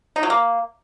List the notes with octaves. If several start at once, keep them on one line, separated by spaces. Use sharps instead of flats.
D#4
F#3
A#3